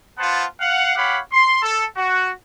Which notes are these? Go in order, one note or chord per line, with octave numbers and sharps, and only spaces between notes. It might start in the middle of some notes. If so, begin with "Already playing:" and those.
B3 F4 C5 F#5 A5
F5 F#5
G4 C#5 F5 F#5 B5
C6
A4
F#4